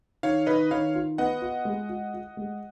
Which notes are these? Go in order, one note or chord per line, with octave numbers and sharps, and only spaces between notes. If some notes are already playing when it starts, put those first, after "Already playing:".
D#3 C#5 F5
D#3 B4 D#5
D#3 C#5 F5
F4
B3 D#5 F#5
F4
G#3
F4
F4
G#3